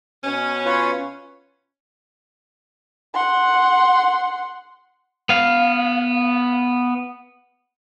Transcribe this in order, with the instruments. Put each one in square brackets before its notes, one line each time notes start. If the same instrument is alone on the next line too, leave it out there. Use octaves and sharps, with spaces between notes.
[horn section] B2 C#4
[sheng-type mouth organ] F4 B4 C#5
[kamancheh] F#5 C6
[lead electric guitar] B3 F5